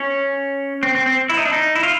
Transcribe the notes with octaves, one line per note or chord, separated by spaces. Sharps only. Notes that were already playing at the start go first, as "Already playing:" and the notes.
Already playing: C#4
C4
C4
C4
E4
D#4
D4
D#4
E4
F4